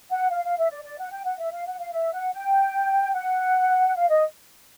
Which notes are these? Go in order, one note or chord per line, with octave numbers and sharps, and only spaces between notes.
F#5
F5
F5
E5
D5
D5
F#5
G5
F#5
E5
F5
F#5
F5
E5
F#5
G5
F#5
F5
D#5